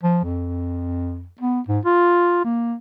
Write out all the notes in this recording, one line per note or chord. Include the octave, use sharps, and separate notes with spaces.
F3
F2
B3
G#2
F4
A#3